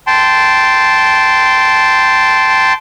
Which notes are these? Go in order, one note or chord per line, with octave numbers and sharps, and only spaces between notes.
G5 A5 C6